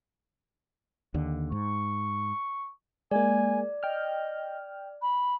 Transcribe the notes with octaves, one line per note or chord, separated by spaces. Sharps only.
D#2 D3
G#2 C#6
G#3 A#3 D5 G#5
D#5 G5 F6
B5